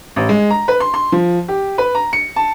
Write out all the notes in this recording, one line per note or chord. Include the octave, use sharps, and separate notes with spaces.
A1
G#3
A#5
B4
C6
C6
F3
G4
B4
A#5
C#7
A5